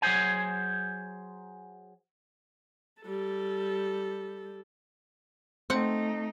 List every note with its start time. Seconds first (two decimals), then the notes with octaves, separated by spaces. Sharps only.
0.02 F#3 G#4 C5 G#5
3.02 G3 A4
5.70 A3 C4 D#4 F#5